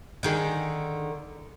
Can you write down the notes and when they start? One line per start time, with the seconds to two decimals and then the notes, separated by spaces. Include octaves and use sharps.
0.23 D3 D#3 G#4